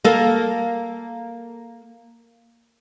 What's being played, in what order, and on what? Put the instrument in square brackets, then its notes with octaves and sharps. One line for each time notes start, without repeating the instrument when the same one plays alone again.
[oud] A#3 A4